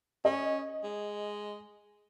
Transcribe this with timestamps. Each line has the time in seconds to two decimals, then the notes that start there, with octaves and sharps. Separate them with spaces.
0.25 C#4 D#5
0.84 G#3